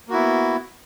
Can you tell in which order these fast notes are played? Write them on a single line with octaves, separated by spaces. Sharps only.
A#3 F#4 E4 B3